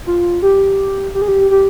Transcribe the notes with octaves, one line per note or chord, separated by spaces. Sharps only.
F4
G4
G4
G#4
G4
G4